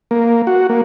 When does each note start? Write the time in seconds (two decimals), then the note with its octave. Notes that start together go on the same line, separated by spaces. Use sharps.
0.11 A#3
0.47 F#4
0.69 A#3